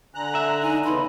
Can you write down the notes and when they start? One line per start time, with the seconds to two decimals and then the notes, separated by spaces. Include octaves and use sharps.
0.15 D3 G#5 A#5 F#6
0.35 E5
0.63 D#4 G#5
0.85 E2 C#3 E3 B5 C6